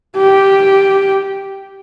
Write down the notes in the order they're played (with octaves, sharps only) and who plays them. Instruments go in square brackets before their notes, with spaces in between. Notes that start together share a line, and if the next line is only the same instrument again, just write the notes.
[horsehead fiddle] G4